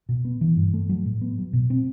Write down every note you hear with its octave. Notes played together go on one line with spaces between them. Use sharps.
B2
B3
E3
G2
A3
F#3
A2
B3
F#3
B2
C4